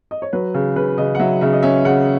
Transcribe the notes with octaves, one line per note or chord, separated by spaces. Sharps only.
D#5
C#5
F#3 B4
C#3
C#3 B4
C#3 D#5
F#5
F#3 E5
C#3 E5
D#5
C#4 E5
C#3 F#5